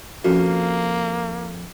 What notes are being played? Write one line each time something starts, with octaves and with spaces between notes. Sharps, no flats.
F2 A#3 C#4 F#4